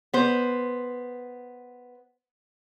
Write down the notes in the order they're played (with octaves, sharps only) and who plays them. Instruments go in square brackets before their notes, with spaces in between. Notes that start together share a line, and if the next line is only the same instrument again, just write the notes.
[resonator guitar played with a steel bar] B3 C5